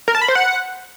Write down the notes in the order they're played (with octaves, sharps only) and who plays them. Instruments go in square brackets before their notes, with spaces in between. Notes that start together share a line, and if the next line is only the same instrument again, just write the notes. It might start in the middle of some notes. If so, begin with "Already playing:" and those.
[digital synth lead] A#4
A5
B5
C5
F#5